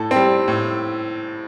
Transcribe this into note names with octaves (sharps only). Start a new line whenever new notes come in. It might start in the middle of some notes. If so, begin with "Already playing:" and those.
Already playing: A2 A4
C4
G3
A2